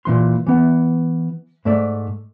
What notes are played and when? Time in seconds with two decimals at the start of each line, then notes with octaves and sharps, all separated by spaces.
0.05 A#2 E3 C6
0.47 E3 B3
1.65 G#2 A3 D5